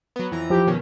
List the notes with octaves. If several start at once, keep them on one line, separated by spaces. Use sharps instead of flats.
F#3 B3
F2 E3 A#5
F3 G4
B2 D#3 C#4